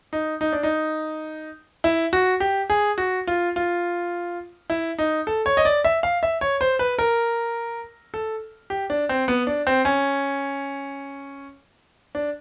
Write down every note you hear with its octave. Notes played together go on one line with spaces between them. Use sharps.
D#4
D#4
D4
D#4
E4
F#4
G4
G#4
F#4
F4
F4
E4
D#4
A4
C#5
D#5
D5
E5
F5
E5
C#5
C5
B4
A#4
A4
G4
D4
C4
B3
D4
C4
C#4
D4